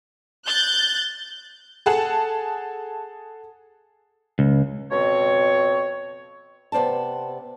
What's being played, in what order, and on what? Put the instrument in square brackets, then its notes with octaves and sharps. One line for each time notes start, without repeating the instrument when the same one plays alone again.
[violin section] F#6 G6 A6
[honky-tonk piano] G#4 A4 F#5 A5
[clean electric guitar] C#2
[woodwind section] F2 B2 C4 C#5
[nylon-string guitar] C3 B3 C5 D5 A5